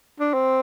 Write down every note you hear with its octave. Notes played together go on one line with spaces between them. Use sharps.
D4
C4